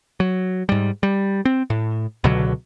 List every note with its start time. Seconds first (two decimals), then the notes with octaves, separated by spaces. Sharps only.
0.20 F#3
0.69 G#2 G3
1.03 G3
1.45 C4
1.70 A2
2.24 C#2 B2 D3 F#3